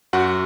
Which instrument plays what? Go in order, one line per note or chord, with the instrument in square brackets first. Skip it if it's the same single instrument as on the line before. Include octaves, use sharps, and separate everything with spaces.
[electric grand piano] F#2 F#4 F#5